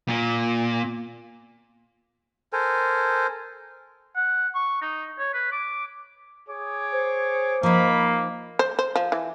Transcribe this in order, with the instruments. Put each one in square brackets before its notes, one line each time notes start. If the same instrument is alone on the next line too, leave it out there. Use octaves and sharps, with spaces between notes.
[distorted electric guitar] A#2
[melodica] A4 A#4 C5 G#5
[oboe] F#5
C#6
D#4
C#5
B4
D6
[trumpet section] G#4 C#5 D6
[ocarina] C5
[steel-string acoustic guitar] F3 D#4 [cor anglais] A#3 [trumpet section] B5
[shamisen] C5
C5
F3
E3